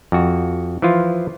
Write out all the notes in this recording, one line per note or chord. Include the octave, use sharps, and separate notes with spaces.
F2 F#4
E3 F3 F4